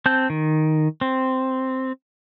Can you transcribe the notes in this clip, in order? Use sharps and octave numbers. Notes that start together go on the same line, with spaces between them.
C4 A5 G6
D#3
C4